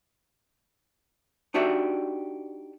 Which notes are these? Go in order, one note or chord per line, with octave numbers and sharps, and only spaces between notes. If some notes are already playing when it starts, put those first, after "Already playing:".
D4 D#4 F#4 G4 D5 E5